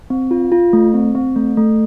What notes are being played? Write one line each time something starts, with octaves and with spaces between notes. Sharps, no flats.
C4
F4
F4
A3
C4
C4
A3
A3